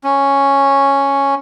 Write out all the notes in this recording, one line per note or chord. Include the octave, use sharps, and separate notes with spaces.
C#4